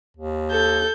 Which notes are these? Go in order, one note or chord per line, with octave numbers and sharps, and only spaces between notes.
D#2
A4 G6